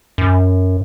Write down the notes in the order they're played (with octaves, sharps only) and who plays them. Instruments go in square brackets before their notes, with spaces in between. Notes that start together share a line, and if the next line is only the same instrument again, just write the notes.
[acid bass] F#2